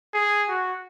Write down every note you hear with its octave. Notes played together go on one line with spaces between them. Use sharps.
G#4
F#4